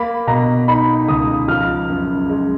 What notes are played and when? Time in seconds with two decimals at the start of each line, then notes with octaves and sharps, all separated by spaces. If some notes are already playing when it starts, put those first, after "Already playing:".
Already playing: A#3 B5
0.27 B2 A#5
0.68 D#4 B5
1.08 C#2 D#6
1.48 F3 F6
1.89 F#2
2.29 G#3